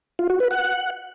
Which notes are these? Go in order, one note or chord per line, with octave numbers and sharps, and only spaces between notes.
F4
F#4
B4
F#5